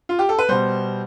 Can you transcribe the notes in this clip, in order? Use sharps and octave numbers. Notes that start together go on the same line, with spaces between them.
F4
G4
A4
B4
B2 G3 C5